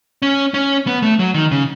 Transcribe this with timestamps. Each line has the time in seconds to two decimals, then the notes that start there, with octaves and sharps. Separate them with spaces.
0.22 C#4
0.54 C#4
0.87 B3
1.02 A3
1.19 F#3
1.34 D#3
1.51 C#3